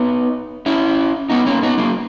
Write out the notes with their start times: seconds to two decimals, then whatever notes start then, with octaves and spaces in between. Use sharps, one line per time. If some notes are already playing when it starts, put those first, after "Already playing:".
Already playing: B3 D#4
0.66 C#4 E4
1.30 B3 D#4
1.46 A#3 C#4
1.63 B3 D#4
1.78 F#3 A#3